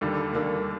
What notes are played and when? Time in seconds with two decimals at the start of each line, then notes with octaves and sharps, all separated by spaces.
0.01 D#2 D3 G3 A#3 D4
0.33 D#2 D3 G3 A#3 D4